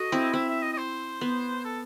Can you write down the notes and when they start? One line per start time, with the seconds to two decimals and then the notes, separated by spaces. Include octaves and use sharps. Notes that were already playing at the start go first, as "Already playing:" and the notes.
Already playing: F#4 A4 D#5
0.12 C4 E4
0.34 C4 E5
0.49 E5
0.63 D#5
0.73 D#5
0.78 C5
1.21 B3
1.65 A4